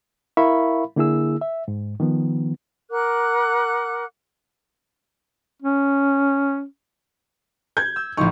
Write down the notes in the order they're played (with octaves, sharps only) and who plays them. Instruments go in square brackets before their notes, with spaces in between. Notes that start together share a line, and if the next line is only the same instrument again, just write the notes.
[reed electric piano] E4 A#4 E5 F5 B5 C#6
D3 A#3 E4 G#4 E6
E5
G#2
D#3 F3 B3
[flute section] A#4 F#5 D6 F#6
[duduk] C#4
[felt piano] G6 G#6
[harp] E6
[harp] A1 F3 D#4 [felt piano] C#6